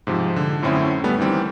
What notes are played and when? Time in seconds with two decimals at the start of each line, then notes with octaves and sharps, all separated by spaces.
0.07 G#2 C3 F3
0.36 D3
0.62 F#2 A2 D3 C4 C#4 E4
1.04 G3 A3 B3 C#4
1.18 D#3 E3 G3 C4